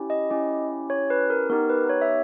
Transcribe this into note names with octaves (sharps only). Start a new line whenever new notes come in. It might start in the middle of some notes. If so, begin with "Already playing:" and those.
Already playing: C#4 E4 G4
D#5
C#4 E4 G4
C#5
B4
A#4
B3 D#4 G4 A#4
B4
C#5
E5